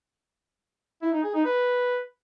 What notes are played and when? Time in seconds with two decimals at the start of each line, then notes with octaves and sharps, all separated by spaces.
1.02 E4
1.13 D#4
1.24 G#4
1.34 D#4
1.45 B4